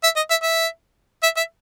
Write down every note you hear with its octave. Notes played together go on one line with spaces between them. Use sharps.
E5
D#5
E5
E5
E5
E5